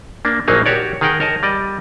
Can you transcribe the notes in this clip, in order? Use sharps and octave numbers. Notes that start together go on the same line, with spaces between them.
A#3 D4
A#1 F#3 A#3 D#4 G#4 A#4
F#4 G4 C#5 D5
D#3 G#4 A#4 F#5 G5
A#4 C#5 D#5 A5
G3 D5 D#5